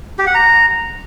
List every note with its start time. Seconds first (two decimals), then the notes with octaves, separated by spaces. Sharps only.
0.19 G4
0.27 F#5
0.35 A#5